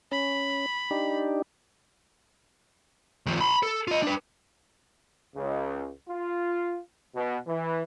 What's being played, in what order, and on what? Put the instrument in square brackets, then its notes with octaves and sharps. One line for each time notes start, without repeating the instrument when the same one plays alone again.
[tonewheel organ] C#4 [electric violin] B5
[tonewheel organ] D4 D#4 G4
[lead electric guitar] D#2 F3
B5 C6
A4
F4 D#5
D4 B4
[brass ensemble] C#2
F4
B2
E3